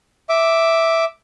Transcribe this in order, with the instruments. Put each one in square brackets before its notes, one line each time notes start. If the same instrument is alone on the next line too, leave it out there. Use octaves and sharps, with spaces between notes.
[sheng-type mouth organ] E5 D6